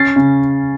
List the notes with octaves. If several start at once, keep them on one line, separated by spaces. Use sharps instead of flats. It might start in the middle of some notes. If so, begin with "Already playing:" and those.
Already playing: C#4 A6 C7
C#3